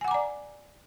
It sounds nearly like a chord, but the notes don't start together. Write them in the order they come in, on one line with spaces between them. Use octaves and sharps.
G#5 F#5 D6 A#5 D5